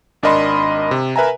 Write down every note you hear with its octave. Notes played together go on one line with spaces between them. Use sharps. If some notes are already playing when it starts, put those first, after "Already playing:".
G#1 D4 A#4 D#5 B5 C6
C3
A#4 B4 E5 G#5 A#5